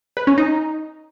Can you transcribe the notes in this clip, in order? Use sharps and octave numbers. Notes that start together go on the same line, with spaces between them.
B4
C#4
D#4